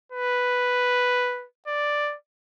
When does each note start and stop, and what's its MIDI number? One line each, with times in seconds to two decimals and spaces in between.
0.12 1.46 71
1.67 2.15 74